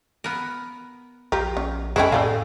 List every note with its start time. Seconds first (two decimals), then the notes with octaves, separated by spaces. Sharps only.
0.24 B3 A#4
1.32 A#1 F4 G4 A#4
1.57 C#4
1.96 F2 G#3 A3 C#4 E4 C#5 G5
2.12 A2 A4 D5 D#5 F5